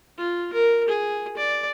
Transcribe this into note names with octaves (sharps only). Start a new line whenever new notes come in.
F4
A#4
G#4
D5